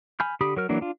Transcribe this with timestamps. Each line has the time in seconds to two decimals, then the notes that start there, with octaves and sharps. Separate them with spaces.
0.20 G#5 B5 F6 G6
0.41 D3 G4 B5 D#6
0.56 F#3 A#4 F6
0.69 E3 F#3 A#3 D4
0.81 D4 F4